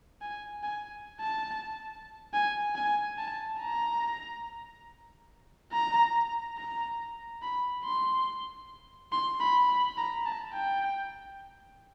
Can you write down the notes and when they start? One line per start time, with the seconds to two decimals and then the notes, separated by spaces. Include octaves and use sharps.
0.22 G#5
0.63 G#5
1.20 A5
2.33 G#5
2.75 G#5
3.18 A5
3.61 A#5
5.72 A#5
6.58 A#5
7.42 B5
7.85 C6
9.12 C6
9.40 B5
9.69 B5
9.98 A#5
10.25 A5
10.53 G5